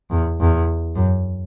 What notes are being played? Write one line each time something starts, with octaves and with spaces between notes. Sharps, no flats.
E2
E2
F#2